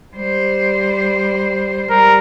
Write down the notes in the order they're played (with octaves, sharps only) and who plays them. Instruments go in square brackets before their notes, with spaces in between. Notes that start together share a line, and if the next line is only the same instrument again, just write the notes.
[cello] G3 C5
[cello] G3 [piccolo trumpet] A#4